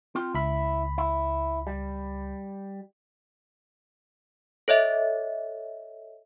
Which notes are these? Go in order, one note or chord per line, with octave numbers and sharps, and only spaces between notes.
C4 F4 G5
C#2 E4 B5
E4
G3
A4 C#5 D#5 E5